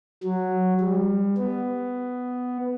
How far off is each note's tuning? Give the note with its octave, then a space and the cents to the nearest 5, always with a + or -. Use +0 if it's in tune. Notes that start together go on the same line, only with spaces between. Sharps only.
F#3 -5
G3 +30
B3 +10